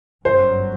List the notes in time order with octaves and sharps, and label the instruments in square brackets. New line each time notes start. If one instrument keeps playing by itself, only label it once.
[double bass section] G1 F#2 F#3 [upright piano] C5